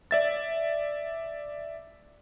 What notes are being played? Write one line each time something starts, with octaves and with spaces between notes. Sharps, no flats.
D5 E5 A6